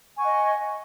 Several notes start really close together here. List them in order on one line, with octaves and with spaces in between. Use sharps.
G#5 C#6 F#5 D#5